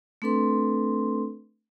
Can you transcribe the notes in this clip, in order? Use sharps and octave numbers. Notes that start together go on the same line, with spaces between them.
A3 C4 D4 A4 B4 C6